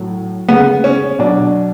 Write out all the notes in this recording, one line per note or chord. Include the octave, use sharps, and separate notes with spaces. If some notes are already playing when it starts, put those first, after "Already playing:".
Already playing: A2 F#3
C#3 G#3 B3
C#4
B2 F#3 D4